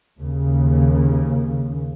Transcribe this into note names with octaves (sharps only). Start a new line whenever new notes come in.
D#2 C#3